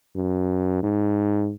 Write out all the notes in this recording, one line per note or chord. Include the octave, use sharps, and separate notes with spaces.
F#2
G#2